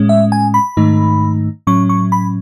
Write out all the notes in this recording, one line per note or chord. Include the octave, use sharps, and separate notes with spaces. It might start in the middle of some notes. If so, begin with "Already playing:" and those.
Already playing: A2 G#3 C#4
E5
G#5
B5
G#2 D#3 A3 D#4
A2 F#3 C#4 C#6
C#6
B5